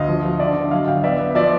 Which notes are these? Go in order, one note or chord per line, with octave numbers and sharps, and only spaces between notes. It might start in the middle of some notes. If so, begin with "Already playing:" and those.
Already playing: D2 D#5 F5
F3
F3
D3 D5 E5
D3
F#3 D#5 F5
G1 F5 G5
B3 D5 E5
B3
F3 D5 E5